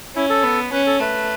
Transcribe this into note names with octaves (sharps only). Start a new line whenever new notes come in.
C#4 E4
A4
B3
C#4 B4
A4
A3 B4